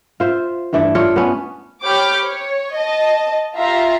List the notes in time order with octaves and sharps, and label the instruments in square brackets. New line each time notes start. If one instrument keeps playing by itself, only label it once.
[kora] F4 C5 E5
G2 E3 A3 D5
F4 A4 C#5 D5
B3 C#4
[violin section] G4 C#5 B5 D6 F6 G6
C#5
D#5 A5
F4 G4 E5 F5 A#5 C6